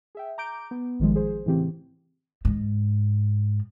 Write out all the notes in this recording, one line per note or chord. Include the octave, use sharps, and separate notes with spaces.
G#4 E5 G5
A#5 D6 G6 D7
B3
A1 D#3 F3 G#3
G#4 C5
A2 C#3 E3 C4 G4
G#2